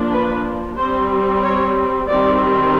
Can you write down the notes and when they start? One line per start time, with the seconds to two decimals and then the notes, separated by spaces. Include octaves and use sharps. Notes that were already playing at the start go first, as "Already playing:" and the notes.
Already playing: F3 A#3 D4
0.11 B4
0.77 G3 C4 C5
1.42 C#5
2.07 D#3 G3 C4 D5